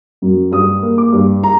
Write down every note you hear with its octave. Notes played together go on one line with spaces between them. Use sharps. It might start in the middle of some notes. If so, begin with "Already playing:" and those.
F#2
G2 D#6
A#3
D6
G2
A#5